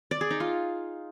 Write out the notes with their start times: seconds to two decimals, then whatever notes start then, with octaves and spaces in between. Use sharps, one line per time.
0.11 D5
0.21 G#4
0.31 D#4
0.40 F4